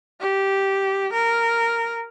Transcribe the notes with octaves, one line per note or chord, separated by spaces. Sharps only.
G4
A#4